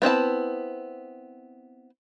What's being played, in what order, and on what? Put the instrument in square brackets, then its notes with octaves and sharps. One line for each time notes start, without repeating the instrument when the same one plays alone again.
[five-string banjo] B3 C4 E4 A5